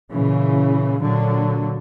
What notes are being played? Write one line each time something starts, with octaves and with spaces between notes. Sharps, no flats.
A#2 C#3 E3
A#2 D3 F#3